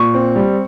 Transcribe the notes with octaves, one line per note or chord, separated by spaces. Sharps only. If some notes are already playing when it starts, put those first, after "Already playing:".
Already playing: A#2 C#6
C4
G3